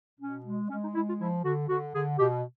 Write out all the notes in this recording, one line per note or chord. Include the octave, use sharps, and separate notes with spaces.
B2 C#4
G#3
G#3 C#4
D#4
G#3 E4
F4
F3 E4
D3 F#4
D3 F#4
D3 G#4
B2 G4